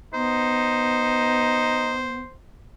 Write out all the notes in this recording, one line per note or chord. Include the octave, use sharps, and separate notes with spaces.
B3 D#4 C5